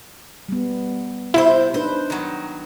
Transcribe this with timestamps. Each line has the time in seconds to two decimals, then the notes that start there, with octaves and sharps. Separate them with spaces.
0.49 G3 B3
1.34 C3 E4 G4 C5
1.74 D4 D#4 B4 C5
2.10 D#3 F#3